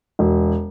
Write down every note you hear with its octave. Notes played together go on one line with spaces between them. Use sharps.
E1